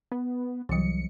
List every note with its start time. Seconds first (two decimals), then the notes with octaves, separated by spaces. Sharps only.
0.12 B3
0.69 C2 E3 F#3 C#7